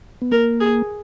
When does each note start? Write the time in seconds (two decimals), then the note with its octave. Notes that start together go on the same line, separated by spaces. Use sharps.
0.22 B3
0.32 A#3 A#4
0.60 G#4